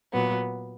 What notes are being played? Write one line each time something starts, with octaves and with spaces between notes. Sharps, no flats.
A#2 F#3 B3